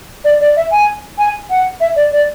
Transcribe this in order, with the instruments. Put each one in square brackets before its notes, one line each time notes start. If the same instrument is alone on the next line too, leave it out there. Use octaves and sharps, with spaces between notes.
[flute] D5
D5
E5
G#5
G#5
F#5
E5
D5
D5